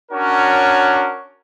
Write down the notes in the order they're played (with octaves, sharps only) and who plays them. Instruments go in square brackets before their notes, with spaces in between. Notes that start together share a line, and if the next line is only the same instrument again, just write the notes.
[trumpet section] C#4 D4 F#4 A#4 C#5